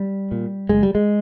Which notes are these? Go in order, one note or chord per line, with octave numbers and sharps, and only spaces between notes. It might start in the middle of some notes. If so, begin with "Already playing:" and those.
Already playing: G3
A#2
F#1 G#3
G3
G#3